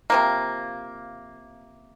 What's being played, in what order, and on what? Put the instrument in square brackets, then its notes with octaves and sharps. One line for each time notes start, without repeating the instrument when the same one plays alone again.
[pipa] C3 F3 A#3